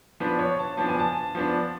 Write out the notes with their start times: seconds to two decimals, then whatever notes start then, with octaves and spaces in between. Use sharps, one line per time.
0.20 F3 B3 D4 B4
0.39 C#5
0.59 A5
0.77 F3 B3 D4 A5
0.88 G#5
0.99 A5
1.35 F3 B3 D4